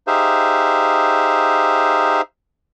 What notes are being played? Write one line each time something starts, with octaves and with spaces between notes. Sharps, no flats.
D#4 G4 G#4 C5 E5 F5